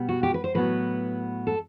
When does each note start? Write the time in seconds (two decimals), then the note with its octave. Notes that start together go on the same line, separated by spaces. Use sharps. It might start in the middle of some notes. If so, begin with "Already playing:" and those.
Already playing: B2 G3 B3
0.09 F#4
0.23 G4
0.34 B4
0.44 C5
0.54 A2 F#3 B3 B4
1.47 A4